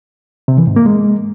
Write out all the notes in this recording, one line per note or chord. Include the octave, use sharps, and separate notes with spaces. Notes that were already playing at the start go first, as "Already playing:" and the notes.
C3
E3
G#2
A#3
G#3